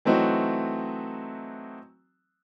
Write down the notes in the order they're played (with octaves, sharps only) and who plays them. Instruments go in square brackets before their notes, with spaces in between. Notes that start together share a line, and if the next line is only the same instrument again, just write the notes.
[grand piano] E3 F#3 A3 C4 D#4 F#4